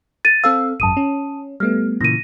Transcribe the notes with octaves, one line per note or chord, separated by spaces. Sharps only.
A6 D#7
C4 A4 F5 E6
G#1 F#2 A5 D#6 D#7
C#4
G3 A3 B3 F6
A#2 C#3 E3 A#6 D#7